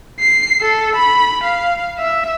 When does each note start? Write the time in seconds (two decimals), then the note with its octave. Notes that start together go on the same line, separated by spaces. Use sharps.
0.20 C7
0.61 A4
0.97 B5
1.44 F5
1.99 E5